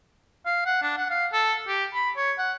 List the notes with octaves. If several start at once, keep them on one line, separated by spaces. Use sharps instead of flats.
F5
F#5
D4
F#5
F5
A4
G4
B5
C#5
F#5